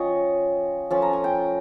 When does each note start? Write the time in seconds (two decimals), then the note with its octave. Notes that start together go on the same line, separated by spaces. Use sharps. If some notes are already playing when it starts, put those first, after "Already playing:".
Already playing: F3 C#4 F4 C#5 D#5 F5 G5
0.91 F3 A3 C#4 A5
1.02 A#5
1.13 G#5
1.24 G5